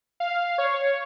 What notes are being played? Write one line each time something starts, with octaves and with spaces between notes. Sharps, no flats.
F5
C#5